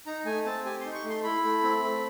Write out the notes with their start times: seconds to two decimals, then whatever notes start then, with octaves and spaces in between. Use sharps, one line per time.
0.06 D#4 A#5
0.25 A3 G#5
0.45 C4 A5
0.65 G4 G#5
0.80 D#4 C6
0.94 C#6
1.04 A3
1.10 C6
1.24 E4 B5
1.44 A3
1.63 C4
1.83 A3